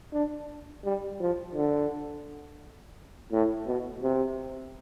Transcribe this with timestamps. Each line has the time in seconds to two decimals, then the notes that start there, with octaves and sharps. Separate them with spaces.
0.13 D4
0.84 G3
1.20 F3
1.54 D3
3.32 A2
3.67 B2
4.02 C3